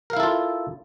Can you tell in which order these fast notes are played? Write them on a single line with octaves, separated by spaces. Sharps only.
A#4 F5 E4 A4 F4